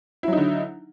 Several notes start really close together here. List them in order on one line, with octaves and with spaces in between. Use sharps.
E4 F#3 D#4 D3